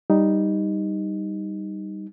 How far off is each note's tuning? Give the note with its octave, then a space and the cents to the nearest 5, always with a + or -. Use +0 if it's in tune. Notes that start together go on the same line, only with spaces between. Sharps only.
G3 +0 D#4 +0